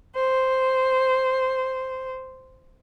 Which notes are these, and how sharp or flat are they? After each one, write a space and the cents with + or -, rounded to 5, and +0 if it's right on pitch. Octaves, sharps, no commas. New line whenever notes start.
C5 -5